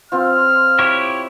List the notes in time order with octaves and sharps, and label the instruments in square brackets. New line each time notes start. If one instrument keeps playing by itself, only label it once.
[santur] C4 F4 [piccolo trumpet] F6
[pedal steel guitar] E4 G4 C#5